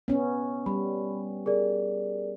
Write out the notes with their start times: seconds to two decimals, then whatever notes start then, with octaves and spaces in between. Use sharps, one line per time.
0.08 B3 C#4
0.66 G3 B5
1.46 G#4 A#4 D5